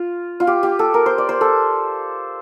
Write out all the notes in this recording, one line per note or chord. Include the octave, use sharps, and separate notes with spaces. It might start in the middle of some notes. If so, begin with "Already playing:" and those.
Already playing: F4
F4
G4
G4
A4
A#4
C5
D5
C5
A4